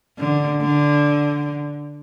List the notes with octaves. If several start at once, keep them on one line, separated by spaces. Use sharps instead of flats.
D3
D3